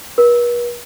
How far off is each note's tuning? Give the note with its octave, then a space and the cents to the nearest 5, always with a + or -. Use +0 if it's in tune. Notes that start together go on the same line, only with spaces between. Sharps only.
B4 -45